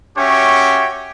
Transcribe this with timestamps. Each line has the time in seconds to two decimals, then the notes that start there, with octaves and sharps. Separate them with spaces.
0.18 C#4 F#4 G4 C#5 E5 G5